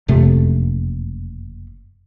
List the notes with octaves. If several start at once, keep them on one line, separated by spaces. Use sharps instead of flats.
F#1 F2 C3 A3